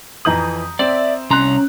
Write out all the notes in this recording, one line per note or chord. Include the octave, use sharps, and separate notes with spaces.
F2 E3 A#5 D#6 G6 F#7
C4 D5 E5
C2 C#4 A#5 C6 F#6